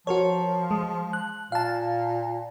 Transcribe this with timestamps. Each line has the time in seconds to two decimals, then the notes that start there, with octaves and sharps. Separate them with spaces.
0.07 F3 F#4 A#4 C#5
0.71 G#3
1.13 F#6
1.52 A#2 F5 A5